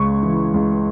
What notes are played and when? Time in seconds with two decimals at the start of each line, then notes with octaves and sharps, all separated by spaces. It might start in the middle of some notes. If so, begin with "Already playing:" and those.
Already playing: C#2 C#3 C#6
0.23 E3
0.54 C#2